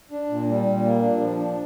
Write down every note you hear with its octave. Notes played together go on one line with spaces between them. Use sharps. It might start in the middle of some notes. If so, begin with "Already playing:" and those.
D4
A#2
G3
A#2
A#3
D4
F3
D4